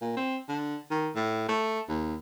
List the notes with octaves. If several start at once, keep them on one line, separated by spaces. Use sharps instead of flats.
A#2
C4
D3
D#3
A2
A3
D#2